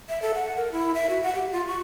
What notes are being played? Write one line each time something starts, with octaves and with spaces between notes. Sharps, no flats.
E5
A4
F#5
A#4
E4
E5
F#4
F#5
G4
F4
C#6